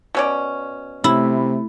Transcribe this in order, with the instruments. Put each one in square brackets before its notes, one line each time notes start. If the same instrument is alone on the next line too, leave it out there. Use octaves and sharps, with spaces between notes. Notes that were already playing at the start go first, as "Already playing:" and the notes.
[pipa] B2 C#4 D5
[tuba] C3 [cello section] A3 [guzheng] E4